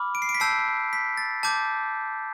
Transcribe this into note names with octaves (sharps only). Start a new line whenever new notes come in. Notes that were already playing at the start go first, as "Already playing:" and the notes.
Already playing: B5 D6 F6
D7
C7
D7
B6
A5 E6 G6 C7
B6
A6
A5 D6 G6